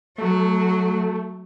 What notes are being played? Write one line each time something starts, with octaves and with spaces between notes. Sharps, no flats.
F#3 A3